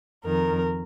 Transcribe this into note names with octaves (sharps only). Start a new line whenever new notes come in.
F2 D#3 A#4